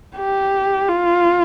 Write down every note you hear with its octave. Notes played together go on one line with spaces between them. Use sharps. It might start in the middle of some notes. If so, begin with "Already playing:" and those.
G4
F4